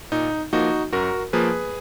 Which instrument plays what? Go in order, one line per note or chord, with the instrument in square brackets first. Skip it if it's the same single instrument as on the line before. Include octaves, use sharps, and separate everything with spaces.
[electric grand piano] A#2 D#4
F3 A#3 D#4 F#4
F#2 F#4 A#4
F3 A#3 G#4 B4